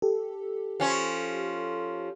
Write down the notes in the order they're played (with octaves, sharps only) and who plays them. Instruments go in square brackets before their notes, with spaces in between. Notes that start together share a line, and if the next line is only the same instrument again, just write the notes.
[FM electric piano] G4 A4
[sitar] F3 C#4